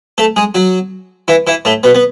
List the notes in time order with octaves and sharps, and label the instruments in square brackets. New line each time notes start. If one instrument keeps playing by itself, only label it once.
[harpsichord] A3 A4
G#3 G#4
F#3 F#4
E3 E4
E3 E4
A2 A3
B2 B3
B3